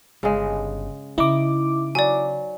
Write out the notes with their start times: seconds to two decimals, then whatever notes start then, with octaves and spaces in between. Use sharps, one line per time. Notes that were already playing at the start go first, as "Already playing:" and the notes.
0.23 G1 C#3 G#3
1.18 C#3 D#4 E4 D6
1.95 F#3 D5 G#5